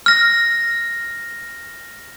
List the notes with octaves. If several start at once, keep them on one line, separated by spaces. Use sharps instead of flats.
F6 A#6